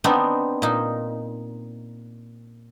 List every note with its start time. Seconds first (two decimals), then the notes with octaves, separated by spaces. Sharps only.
0.04 B3 C4 D4 D#4
0.62 A#2 D#4